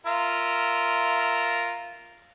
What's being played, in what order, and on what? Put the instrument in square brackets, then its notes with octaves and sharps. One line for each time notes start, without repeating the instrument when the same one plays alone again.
[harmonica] F4 A#4 E5